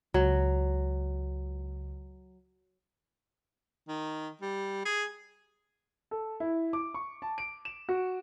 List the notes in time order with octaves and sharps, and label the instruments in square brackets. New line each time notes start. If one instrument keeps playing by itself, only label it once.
[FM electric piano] C#2 [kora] F#3
[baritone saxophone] D#3
G3
G#4
[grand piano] A4
E4
D6
C#6
A5
D7
E7
F#4